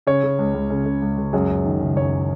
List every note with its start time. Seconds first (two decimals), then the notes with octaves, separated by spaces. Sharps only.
0.07 C#3 C#5
0.23 C#3
0.39 C#2
0.54 C#2
0.70 C#3
0.86 C#3
1.02 C#2
1.18 C#2
1.33 F#2 G#4
1.49 F#1
1.65 D#3
1.80 F#1
1.96 F#2 C#5